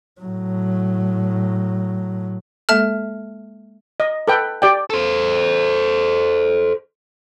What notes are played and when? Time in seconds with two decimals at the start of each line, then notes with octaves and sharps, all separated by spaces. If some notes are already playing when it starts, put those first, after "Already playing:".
0.21 A2 F#3
2.69 G#3 A#3 A4 E5 A5 F6
4.00 D#5
4.28 A4 B4 G5
4.62 G4 D5 G5
4.90 A4 C5